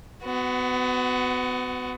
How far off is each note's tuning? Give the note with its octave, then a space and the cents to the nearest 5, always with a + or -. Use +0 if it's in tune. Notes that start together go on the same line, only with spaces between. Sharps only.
B3 +30 F#4 +0